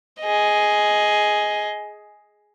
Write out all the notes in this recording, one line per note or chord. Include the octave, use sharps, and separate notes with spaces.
G#4 D#5